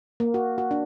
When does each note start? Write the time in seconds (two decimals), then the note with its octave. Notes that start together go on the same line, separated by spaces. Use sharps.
0.20 A#3
0.34 F#4
0.58 F#4
0.71 D4